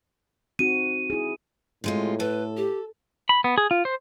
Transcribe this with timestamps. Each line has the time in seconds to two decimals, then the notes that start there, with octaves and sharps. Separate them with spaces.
0.59 C4 D#4 F#4 D#7
1.10 E4 G#4
1.84 A2 C3 G#3 F4
2.20 A4 B4
2.57 G4
3.29 B5
3.44 B3
3.58 G#4
3.71 F4
3.85 C5